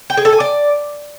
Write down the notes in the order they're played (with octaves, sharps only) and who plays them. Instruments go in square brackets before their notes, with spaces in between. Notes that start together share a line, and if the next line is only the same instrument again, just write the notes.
[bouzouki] G5
G#4
A4
G#5
D5